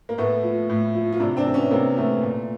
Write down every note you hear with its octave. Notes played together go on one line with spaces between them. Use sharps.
A#3
A2 A3 B3
F3
A2
F3
F4
C3 D4 E4
C4 D4
E3
B3 C#4
C3 A#3 C4
E3 A3 B3
A#2